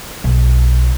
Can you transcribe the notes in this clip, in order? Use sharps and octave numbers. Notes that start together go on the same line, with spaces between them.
B1